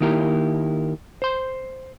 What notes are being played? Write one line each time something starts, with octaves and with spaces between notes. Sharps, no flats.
D#3 A#3 E4 G4 A#4
C5 C6